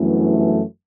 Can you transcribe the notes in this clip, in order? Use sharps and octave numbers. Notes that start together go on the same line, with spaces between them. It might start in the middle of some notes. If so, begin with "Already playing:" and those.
Already playing: G1 F#2 E3 A3